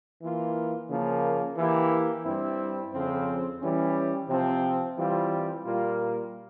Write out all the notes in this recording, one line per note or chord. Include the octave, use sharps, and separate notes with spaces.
E3 A#3 F4
C#3 F3 A#3
E3 A#3 E4 G4
G2 G3 C4 E4
F2 C#3 F3 C4
E3 G3 C#4
C3 F3 C4
E3 G3 C4 F4
A#2 G3 A#3 F4